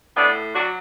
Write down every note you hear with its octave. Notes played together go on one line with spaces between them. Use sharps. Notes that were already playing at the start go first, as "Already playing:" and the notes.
A2 B3 D4
F#3 D4 F#4